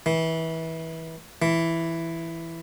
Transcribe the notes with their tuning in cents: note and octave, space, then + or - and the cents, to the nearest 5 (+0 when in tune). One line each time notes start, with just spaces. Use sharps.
E3 -25
E3 +5